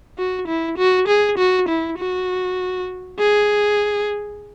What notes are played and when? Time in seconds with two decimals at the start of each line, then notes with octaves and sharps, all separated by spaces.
0.18 F#4
0.48 E4
0.78 F#4
1.08 G#4
1.38 F#4
1.68 E4
1.98 F#4
3.19 G#4